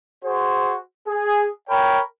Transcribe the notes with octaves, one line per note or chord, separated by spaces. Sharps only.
F#4 G#4 C5
G#4
A#4 C#5 G5 B5